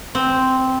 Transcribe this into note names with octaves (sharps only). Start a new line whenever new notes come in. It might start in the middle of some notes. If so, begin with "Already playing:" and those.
C4